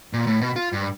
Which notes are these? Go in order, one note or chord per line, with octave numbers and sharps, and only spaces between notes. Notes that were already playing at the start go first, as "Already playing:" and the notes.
A#2
A2
B2
F4
G2